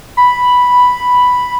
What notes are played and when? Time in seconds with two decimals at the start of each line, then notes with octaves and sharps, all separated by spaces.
0.17 B5